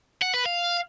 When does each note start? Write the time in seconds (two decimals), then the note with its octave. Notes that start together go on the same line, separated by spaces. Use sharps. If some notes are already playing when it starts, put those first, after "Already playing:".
0.22 F#5
0.34 B4
0.45 F5